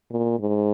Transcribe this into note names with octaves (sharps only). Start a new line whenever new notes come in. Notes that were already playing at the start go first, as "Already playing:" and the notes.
A#2
G#2